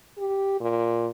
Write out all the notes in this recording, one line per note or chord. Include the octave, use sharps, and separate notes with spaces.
G4
A#2